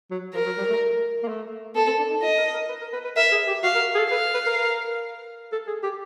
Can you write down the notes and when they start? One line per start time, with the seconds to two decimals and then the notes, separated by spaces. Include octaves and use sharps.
0.11 F#3
0.34 F3 A#4
0.46 F#3
0.58 G3
0.70 A3
1.23 A#3
1.28 A3
1.75 B3 A4
1.87 C4
1.99 D4
2.11 D#4
2.22 F4 D#5
2.38 A#4
2.54 A#4
2.69 B4
2.81 A#4
2.93 B4
3.04 B4
3.16 A#4 E5
3.32 G#4
3.48 G4
3.63 F#4 F5
3.75 A#4
3.95 G#4
3.99 A4
4.11 B4 F5
4.34 B4
4.46 A#4
5.52 A4
5.67 G#4
5.83 G4